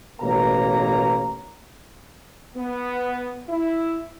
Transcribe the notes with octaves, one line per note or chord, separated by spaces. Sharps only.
A1 B2 A#3 C#5 A#5
B3
E4